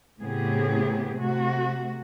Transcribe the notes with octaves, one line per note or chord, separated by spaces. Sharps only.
A2 C#3 B3 C4 G4 G#4
C3 A3 F#4